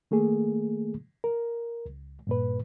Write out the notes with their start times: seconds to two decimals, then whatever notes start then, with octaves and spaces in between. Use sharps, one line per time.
0.11 D#3 A3 A#3 G#4
1.24 A#4
1.86 C#2
2.27 G2 A#2 B4